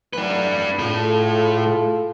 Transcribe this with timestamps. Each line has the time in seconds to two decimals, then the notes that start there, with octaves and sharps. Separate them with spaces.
0.13 E3 F#3 A3 D4 B4
0.79 A2 A3 F4 G#4 A4